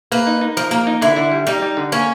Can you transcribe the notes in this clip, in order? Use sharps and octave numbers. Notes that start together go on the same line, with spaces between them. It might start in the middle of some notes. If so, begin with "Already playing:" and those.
A#3 B4
D#4
D#4
F3 A#4
A#3 A#4
D#4
D3 E4
D3
G3
G3 D#4
G3
D3
A#3 C#4